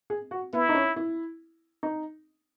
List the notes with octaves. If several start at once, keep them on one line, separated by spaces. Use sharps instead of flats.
G#4
F#4
B3 E4
D#4
C#4
E4
D#4